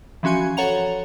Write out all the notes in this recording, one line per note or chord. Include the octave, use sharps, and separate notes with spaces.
E3 F3 C#4 F#4 G#5 C#6
A4 C#5 F#5 A#5 F7